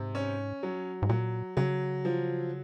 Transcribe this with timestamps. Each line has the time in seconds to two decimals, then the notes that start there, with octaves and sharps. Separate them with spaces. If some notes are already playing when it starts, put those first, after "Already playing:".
Already playing: G#2 C3
0.15 C#4
0.63 F#3
1.02 G#2
1.09 A#2 F#3
1.57 C#3 F#3
2.05 F3